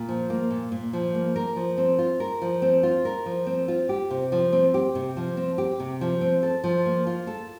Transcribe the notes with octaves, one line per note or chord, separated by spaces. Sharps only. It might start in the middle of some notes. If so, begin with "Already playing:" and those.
Already playing: A#2
F3
A#3
A#2
A#2
F3
A#3
A#4
F3
C4
F4
A#4
F3
C4
F4
A#4
F3
C4
F4
G4
C3
F3
C4
G4
C3
F3
C4
G4
C3
F3
C4
A4
F3
A#3
F4
A4